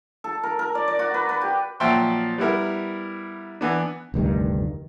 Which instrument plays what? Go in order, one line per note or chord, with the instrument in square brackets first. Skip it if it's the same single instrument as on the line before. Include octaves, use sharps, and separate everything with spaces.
[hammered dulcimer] A4
A#4
A#4
D5
D5
F#4
B4
B4
G4
[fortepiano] A#2 F3 F#3 E5 G5 C6
G3 B3 E4 A#4
E3 B3 D4
[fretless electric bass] F1 D2 G2 D#3